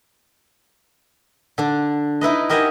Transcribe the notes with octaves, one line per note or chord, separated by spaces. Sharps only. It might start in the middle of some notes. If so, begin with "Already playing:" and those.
D3 D4
D#4 E4 B4 D#5
G4 A#4 D#5 E5 F#5 G#5